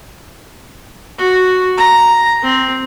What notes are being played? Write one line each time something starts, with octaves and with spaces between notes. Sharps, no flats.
F#4
A#5
C4